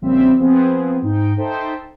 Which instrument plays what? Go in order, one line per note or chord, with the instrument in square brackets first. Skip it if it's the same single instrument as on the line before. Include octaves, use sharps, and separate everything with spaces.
[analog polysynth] A#1 C#3 F3 G3 C4 E5
F3 B3 C4 G#4
G#2 D#4 G5
D#4 A4 C5 E5 G5 A5